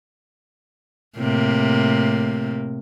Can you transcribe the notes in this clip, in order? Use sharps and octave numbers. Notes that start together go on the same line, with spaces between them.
A2 C3 A#3